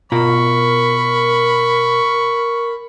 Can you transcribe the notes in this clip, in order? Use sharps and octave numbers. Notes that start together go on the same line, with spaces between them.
B2 F4 A#4 A#5 B5 C#6